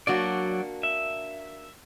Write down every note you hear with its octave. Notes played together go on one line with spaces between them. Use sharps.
F#3 A#3 D4 F#4 D5
E5